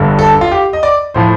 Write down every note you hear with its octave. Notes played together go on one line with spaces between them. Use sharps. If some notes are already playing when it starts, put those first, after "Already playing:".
Already playing: G1 G2 D3
A4
F4
G4
D#5
D5
A2 F3 C5